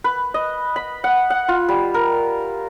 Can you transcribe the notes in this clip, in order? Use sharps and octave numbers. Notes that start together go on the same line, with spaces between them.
B4
D#5
B5
F#5
F#5
F4
G3
A#4